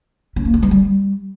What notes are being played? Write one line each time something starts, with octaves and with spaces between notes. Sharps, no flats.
C#4
A#3
D4
G#3
G3